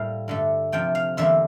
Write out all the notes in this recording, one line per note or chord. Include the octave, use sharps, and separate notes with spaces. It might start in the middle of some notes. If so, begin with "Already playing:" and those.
Already playing: A2 G3 A#3 F5
G2 D3 A3
C3 F3 A3 G5
F5
E2 D3 G3 A#3 E5